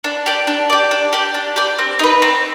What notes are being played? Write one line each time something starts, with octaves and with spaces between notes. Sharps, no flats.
D4
G4 D5
D4
G4 D5
D4
G4 D5
D4
G4 D5
C4
D#4 B4
C4